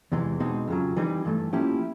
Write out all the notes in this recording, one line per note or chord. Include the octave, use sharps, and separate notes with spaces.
E2 C3 E3 G#3
B2 G#3 C4 D#4
F2 C#3 F#3
E3 G3 C4 D#4
G2 E3 A3
F3 A#3 C#4 E4 G4